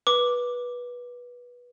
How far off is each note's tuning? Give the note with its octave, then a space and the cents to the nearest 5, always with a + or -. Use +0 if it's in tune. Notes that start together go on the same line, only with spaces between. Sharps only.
B4 -20 D6 +0